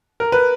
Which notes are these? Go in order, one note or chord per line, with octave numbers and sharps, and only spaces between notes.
A#4
B4